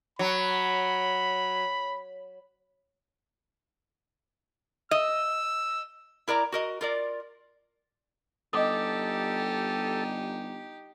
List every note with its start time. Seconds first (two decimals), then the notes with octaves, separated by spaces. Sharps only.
0.19 F#3 B5
4.91 D#5 E6
6.28 E4 A#4 D5 A#5
6.52 F#4 A#4 D#5
6.81 F4 A#4 D5
8.53 G1 D#4 G4 A4 D#5 D6 D#6